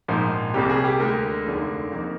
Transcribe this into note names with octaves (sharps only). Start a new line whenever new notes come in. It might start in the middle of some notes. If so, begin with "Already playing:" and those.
A#1 G#2 F3 A#3 D#4
C2 C3 G3 A#3 G4
G#4
G4
D2 D3 G#3 A#4
F1 D#2 D3 G#3
F2 D#3 A#3